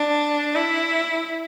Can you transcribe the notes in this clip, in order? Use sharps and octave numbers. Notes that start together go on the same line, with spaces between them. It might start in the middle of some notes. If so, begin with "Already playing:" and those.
Already playing: D4
E4